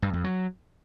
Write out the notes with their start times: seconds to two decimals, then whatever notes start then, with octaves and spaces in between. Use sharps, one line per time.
0.02 G2
0.13 F2
0.24 F#3